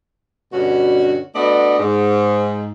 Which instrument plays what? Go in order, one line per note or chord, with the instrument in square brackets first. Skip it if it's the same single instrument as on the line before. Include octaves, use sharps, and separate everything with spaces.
[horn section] G2 B2 D3 C#4 F#4
A3 B3 D4 F#4 D5 D#5
G#2